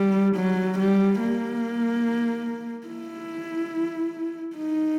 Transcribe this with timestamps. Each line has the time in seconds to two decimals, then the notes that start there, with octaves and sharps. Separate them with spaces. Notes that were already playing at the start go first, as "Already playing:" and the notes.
Already playing: G3
0.36 F#3
0.78 G3
1.20 A#3
2.87 E4
4.56 D#4